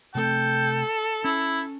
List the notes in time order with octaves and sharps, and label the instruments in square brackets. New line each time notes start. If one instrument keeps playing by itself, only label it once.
[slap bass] C3 A3 C4 [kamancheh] A4 [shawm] G5
[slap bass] C#4 [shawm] E4